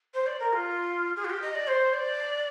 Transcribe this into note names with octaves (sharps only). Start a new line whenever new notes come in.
C5
D5
A#4
F4
G#4
F4
G4
D#5
D5
C5
D5